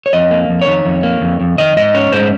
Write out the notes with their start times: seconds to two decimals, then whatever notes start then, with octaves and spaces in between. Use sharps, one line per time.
0.06 C#5
0.13 F2 D#5
0.31 A#3
0.50 F2
0.61 C#5
0.67 D#3
0.86 F2
1.03 A#3
1.22 F2
1.41 F2
1.58 D#3 D#5
1.77 G#2 D#5
1.94 C#4 C#5
2.12 G#2 C5